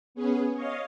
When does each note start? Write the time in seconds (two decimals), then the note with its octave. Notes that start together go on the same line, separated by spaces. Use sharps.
0.15 B3 C#4 G#4
0.54 C#5 D#5 F5